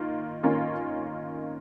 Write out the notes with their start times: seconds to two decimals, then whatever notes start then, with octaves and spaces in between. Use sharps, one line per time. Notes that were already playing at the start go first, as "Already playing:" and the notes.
Already playing: D#3 A#3 F4
0.43 D#3 A#3 C#4 F4